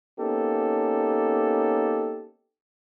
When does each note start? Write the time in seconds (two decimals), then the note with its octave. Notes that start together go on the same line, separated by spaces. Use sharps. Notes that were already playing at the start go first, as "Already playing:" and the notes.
0.19 A#3 B3 C#4 D#4 G4 A4